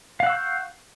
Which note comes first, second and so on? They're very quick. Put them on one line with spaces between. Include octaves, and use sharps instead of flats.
F5 F#5 E6 C#6 G6